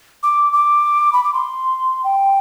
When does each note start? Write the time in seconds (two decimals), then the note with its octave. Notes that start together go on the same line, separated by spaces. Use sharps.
0.23 D6
0.53 D6
1.13 B5
1.24 D6
1.34 C6
2.04 G5